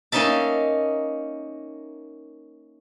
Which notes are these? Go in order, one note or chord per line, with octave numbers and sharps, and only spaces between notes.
A#3 C#4 D#4 E5 A5